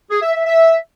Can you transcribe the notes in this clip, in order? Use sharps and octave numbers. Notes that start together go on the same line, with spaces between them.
G#4
E5
E5
E5